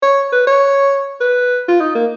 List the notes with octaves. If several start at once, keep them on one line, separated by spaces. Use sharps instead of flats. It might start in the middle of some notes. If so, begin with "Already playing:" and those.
C#5
B4
C#5
B4
F4
D#4
A#3